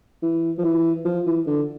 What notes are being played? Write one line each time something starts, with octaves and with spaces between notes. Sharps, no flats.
E3
F3
E3
F3
E3
D3